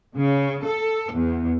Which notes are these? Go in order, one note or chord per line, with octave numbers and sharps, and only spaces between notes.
C#3
A4
E2